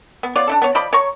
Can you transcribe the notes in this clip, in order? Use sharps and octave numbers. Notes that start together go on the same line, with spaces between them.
B3
B3 F4 C#5 D5
D4 E4 A4
B3 C#5
F3 D5 D#5 B5
C#5 A#5 C#6